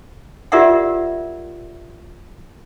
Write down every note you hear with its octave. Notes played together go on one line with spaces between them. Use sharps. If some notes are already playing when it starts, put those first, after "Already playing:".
F4 G4 A#4 D5 E5 F#5